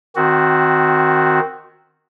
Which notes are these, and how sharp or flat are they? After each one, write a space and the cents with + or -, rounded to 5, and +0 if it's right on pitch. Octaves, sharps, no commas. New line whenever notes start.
D#3 -10 C4 +0 F#4 +0